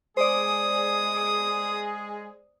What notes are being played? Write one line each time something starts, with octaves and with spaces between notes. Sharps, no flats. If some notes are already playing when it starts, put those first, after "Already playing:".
G#3 G#4 C5 D5 D#6